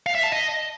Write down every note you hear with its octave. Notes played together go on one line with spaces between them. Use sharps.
F5
E5
A5
D#5